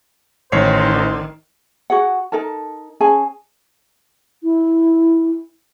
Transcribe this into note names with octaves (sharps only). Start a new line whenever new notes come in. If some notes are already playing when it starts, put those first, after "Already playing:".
A1 D#3 C5 C#5 C7
F#4 G#4 F#5
D#4 A4 A#4 A5
C#4 G#4 G#5 A5
E4